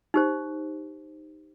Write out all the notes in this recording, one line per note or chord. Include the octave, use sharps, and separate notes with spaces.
D#4 G4 C5